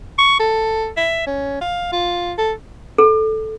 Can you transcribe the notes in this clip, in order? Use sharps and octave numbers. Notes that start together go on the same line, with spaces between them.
C#6
A4
E5
C#4
F5
F4
A4
A4